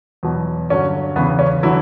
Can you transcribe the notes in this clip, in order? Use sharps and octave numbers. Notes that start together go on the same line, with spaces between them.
E2 B2 F#3
G2 D3 F#3 C#4
E2 C#3 E3 B3
C#4
D3 E3 F#3 E4